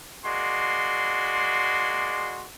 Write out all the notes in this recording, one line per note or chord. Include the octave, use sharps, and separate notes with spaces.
G#3 A#3 F#4 D5 C6